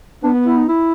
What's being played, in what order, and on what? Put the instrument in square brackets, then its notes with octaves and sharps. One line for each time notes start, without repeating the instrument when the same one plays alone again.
[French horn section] B3 [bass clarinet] D4
[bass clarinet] E4
D#4
E4